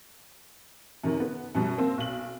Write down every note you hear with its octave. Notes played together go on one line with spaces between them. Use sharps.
F#2 C3 D#3
B3
F#2 B2 G3
A#3 C4
B1 F#7